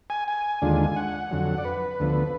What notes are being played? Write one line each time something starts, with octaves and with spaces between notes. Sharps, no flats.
G#5
G#5
D#2 D3 G#3 D4 F4
F#5
F2 D3 F#3
D5
B4
D2 D3 F3 B3